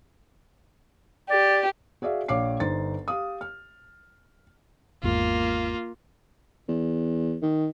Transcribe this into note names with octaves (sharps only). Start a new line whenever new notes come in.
G4 D5
F#4 G#4 D5 E5 F5
A#1 C#5 F5 D6 C7
G1 D#4 C5 A6
G4 F5 D#6
F6
G#1 E2 G#2 A#3 F4
E2
D#3